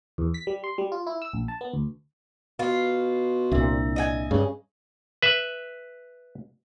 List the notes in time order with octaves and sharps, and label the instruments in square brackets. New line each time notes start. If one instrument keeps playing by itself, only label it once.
[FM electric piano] E2
B6
G3
C6
G3
F4
E4
E6
A#1
A5
B3
D2
[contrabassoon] B2 [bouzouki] F4 [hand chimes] B4
[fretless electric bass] C2 A#2 [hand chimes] D4 E5
[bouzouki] D#5 G5 G#5
[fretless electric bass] G2 [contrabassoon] C#3
[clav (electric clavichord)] B4 E5